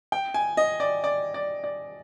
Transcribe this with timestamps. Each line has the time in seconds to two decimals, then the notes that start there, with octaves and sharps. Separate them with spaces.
0.12 G5
0.34 G#5
0.57 D#5
0.80 D5
1.04 D5
1.34 D5
1.64 D5